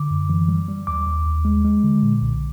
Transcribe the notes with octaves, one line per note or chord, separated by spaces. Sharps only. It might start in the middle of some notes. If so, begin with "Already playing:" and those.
Already playing: D3 D6
F#2
E3
G3
G3
D#2 D6
D#2
D#2
G#3
G#3
D3
A#2
B1